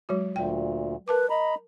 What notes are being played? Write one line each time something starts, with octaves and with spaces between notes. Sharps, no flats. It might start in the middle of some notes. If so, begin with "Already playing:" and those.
F#3 G#3 F#4
D2 A#2 G5
A#4 B4 A5 D6
D#5 A#5 B5